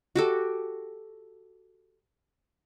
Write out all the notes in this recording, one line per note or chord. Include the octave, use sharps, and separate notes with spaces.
F#4 G4 A4